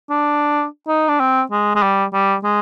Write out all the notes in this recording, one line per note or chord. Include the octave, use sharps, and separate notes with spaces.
D4
D#4
D4
C4
G#3
G#3
G3
G3
G#3